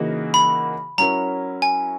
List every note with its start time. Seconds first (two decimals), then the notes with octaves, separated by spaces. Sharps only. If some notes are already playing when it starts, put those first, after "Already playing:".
Already playing: C#3 E3 A#3 D#4 F#4
0.34 B5
0.98 F#3 C#4 E4 A#4 A#5
1.62 G#5